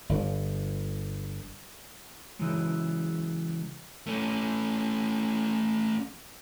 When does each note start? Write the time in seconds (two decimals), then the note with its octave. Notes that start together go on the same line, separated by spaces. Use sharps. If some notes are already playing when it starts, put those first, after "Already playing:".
0.09 G1
2.39 C#3 E3 F#3 G#3
4.06 A3 C#4